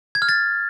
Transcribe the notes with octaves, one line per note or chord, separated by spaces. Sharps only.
G#6
F6
A6